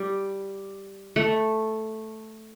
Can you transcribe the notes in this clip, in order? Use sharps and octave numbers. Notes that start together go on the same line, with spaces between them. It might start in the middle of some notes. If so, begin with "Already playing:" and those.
Already playing: G3
A3